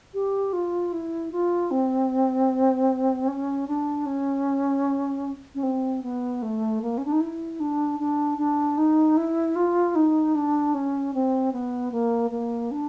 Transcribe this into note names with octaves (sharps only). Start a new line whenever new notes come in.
G4
F4
E4
F4
C4
C#4
D4
C#4
C#4
C4
B3
A3
A#3
C#4
D4
D#4
E4
D4
D4
D4
D#4
E4
F4
D#4
D4
C#4
C4
B3
A#3
A#3
D4